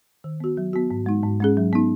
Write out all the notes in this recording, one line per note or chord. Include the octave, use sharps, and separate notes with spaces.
D#3
B3 F#4
F#3
B3 F#4
G#2
G#3 D#4
G#2
G#3 C#4 G#4
F#3
B3 D#4